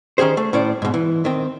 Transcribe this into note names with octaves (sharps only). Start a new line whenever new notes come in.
D#3 C#4 G4 G#4 C5
A3
A2 C#4 C5 D5
G#2 B2
E3
D#3 C4